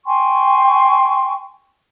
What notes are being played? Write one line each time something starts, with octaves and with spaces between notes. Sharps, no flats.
G5 G#5 C6 C#6